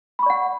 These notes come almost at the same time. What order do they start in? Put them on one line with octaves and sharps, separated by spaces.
B5 C#6 D5 F#5